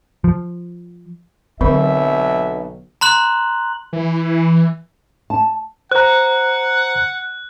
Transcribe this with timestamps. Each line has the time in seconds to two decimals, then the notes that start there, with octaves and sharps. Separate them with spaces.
0.24 F3
1.61 B1 D3 F#3 C4 A#4 E5
3.01 A#5 C6 F#6 F#7
3.93 E3
5.30 A5
5.92 C5 F#5 A#5 F#6